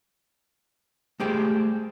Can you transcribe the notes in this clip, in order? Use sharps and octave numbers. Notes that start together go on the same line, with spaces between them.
G#3 A3 G4 G#4 C5 G5